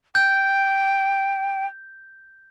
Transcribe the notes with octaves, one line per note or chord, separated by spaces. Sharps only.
G5 G6